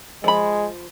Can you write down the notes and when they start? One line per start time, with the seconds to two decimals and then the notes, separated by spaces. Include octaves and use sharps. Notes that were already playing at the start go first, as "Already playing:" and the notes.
0.24 F3 G#3 B5